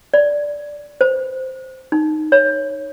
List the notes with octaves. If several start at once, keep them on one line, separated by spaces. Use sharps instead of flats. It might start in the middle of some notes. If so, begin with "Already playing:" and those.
D5
C5
D#4
C#5